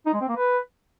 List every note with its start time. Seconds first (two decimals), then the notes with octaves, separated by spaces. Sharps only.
0.06 D#4
0.14 G#3
0.21 C4
0.29 A#3
0.37 B4